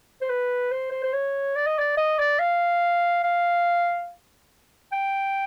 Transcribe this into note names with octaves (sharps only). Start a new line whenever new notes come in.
C5
B4
C5
C5
C5
C#5
D5
D#5
D5
D#5
D5
F5
F5
G5